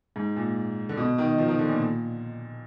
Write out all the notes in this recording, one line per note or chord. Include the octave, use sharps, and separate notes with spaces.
G#2
A#2
D3
B2
D#3
F3
D#3
D3
A#2
A#2